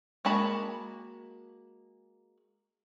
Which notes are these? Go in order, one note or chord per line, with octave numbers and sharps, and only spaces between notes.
G#3 A#3 F#4 A5 B5